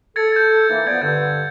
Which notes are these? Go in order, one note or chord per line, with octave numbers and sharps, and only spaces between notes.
A4 G#6 A6 C#7
G6 G#6
E3 A#3 D#4
F3 B3 D5 G#6
G2 D3 G6